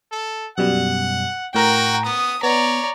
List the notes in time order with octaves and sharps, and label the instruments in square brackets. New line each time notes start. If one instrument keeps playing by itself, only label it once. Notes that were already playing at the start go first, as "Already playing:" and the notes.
[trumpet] A4
[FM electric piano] F#2 B2 G3 [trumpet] F#5
[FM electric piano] A2 A#4 A#5 [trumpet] F#4 [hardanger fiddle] G5
[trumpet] B3 [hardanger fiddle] D#6
[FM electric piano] B3 [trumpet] C#5 [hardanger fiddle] D5 A#5